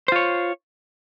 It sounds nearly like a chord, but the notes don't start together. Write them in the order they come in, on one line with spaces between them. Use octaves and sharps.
C5 F4 C#5